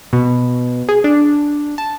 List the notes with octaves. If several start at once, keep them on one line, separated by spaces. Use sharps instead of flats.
B2
G#4
D4
A5